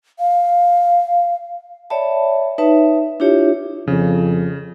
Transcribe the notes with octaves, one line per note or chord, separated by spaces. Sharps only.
F5
C#5 D5 E5 G5 A5 B5
D#4 B4 C#5 E5 A5
D4 E4 F4 G4 C#5 E5
F2 C#3 F3